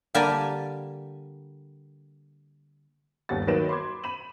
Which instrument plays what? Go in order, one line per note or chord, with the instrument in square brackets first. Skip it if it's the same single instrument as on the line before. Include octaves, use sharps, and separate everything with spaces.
[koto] D3 G3 A#3 G4 G#5 A5
[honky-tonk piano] G1 D#2 G3 F#5 A6
D#3 F#3 A#3 B4 D7 E7
B5 C6 D6 G#6
B5 D#7 E7 F#7